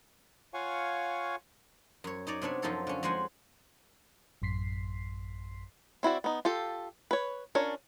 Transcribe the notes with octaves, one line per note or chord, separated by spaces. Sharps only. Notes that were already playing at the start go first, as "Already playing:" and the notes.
F4 C#5 F5 F#5 G#5 C#6
F#2 C#5
D#4 C#5 D5 A#5
C3 B3 D4 C#5
F#2 F3 D#4 F4 A4 C#5
D3 C#4
F2 G#3 C5 F#5 G#5
A1 F#2 C6 B6 C7
C4 E4 F#4 D5
B3 D#4
F4 G4 A4
B4 C#5
C#4 D4 F4 A#4 C#5